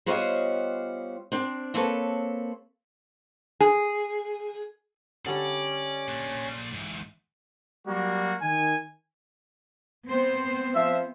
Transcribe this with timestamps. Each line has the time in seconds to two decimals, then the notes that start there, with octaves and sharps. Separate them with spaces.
0.06 G3 B3 F4 C5 C#5 D#5
1.32 C4 D4
1.74 A#3 C4 A4 B4 C#5 A5
3.60 G#4
5.26 D3 G3 C#4 D5
6.08 A#2 D4
6.73 G#2 E3
7.87 F#3 G3 A#3 F#4
8.42 D#3 G#5
10.06 B3 C4 C5
10.75 F3 E5